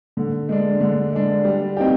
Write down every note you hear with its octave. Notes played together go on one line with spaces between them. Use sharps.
D3
G#3 D4
D3
G#3 D4
G3
C4 D#4 G4